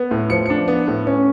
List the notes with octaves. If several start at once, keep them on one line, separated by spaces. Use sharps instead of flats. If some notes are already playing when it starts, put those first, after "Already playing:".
Already playing: B3
A2
F3 C#7
D4 C#7
B3
A2
C#4